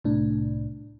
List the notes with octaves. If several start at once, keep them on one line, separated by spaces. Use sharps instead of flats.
C2 A2 D4